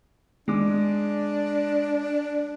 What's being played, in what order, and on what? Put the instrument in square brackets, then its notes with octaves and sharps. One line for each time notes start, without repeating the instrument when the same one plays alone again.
[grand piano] G#3 G#4 D6 [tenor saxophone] D4